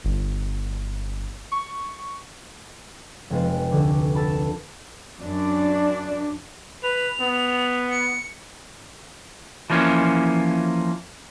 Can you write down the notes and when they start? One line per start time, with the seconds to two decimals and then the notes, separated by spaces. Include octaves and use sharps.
0.04 G1
1.52 C#6
3.30 F1 C3 G#3 F4 B4 F#6
3.71 D2 D3 B4 C#6 D6
4.15 A4 A5 B5
5.20 F#2 D4
6.84 B4 F7
7.20 B3
7.90 C#7
9.70 E3 F3 A#3 C#4